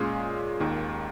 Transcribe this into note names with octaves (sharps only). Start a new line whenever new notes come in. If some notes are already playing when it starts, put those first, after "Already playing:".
Already playing: A#2 G#3 C#4 F4 G#4
D#2 D#3 A#3